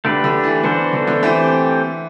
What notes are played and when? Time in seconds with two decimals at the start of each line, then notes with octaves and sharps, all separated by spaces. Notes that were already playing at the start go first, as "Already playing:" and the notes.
0.05 D3 A3 D4 G4 B4
0.24 D3
0.44 E3
0.64 D3 B3 D4 F#4 C5
0.93 D3
1.07 D3
1.23 E3 A3 C4 G4 C5